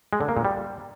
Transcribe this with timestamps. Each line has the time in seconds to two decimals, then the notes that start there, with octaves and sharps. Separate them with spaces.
0.13 G#3
0.21 D3
0.29 A#3
0.37 A#2
0.45 G3